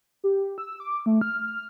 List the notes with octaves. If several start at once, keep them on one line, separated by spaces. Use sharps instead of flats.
G4
E6
D6
A3
F6